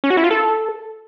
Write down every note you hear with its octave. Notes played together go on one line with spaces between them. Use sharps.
C#4
F#4
E4
F4
A4